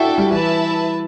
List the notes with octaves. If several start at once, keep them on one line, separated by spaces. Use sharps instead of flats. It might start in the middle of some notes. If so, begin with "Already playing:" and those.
Already playing: D4 E4 F#4 A4 E5 G5
G3
E3 E4 B4 E5 A5